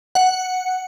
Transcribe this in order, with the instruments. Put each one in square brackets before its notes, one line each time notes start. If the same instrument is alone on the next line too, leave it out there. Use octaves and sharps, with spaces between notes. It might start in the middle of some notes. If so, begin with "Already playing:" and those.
[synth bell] F#5